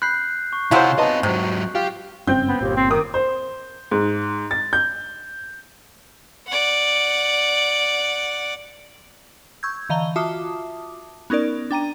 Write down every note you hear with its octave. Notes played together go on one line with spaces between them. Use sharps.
B5 F#6 G6 C7
C#6
C3 F#3 G#3 E4 F4 C5 F#5
B3 C4 D#4 D#5 A5
G#2 C3 F#3
F4 G4
F#1 G2 C4 C#4 G6
B3
G1 D#2 A#2
C4
D#3 D6 D#6
C5
G#2
A6
G6
D5 F#5
C#6 E6 G6 G#6
D3 E3 D#5 F5 A#5 G7
F4 F#4 E5 A5 D6 D#6
B3 C#4 D#4 A#4 D5
D4 G5 A#5 D#7